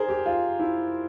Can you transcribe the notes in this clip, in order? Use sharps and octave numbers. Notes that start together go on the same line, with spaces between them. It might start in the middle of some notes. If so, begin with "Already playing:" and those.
Already playing: G#4 A#4 C5
G4
F4
E4